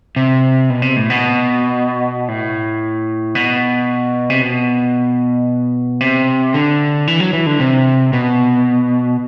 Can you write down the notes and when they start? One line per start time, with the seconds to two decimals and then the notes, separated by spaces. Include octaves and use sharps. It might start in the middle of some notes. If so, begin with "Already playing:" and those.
0.16 C3
0.70 B2
0.82 C3
0.96 A2
1.10 B2
2.28 A2
3.35 B2
4.30 C3
4.42 B2
6.01 C3
6.54 D3
7.07 E3
7.20 F#3
7.33 E3
7.46 D3
7.60 C3
8.13 B2